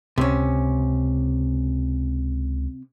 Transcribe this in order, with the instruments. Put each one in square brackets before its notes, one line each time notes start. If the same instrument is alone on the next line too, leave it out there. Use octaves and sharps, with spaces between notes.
[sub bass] C#2 [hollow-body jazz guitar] C3 C#4